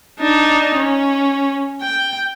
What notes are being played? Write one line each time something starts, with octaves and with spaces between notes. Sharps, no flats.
D4 D#4
C#4
G5